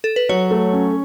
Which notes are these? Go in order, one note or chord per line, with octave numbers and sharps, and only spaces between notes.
A4
B4
F#3 C#5
A3
C#4